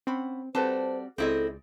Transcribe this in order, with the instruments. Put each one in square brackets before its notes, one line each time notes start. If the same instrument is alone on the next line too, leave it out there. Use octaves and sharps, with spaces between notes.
[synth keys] C4 [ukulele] C#4 F#5 B5
[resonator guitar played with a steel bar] G3 F#4 [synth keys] C4 [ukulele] A4 B4 A5 [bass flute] C5
[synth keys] C#2 [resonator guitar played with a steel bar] C4 E4 D#5 [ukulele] G#4 D5 [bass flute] A4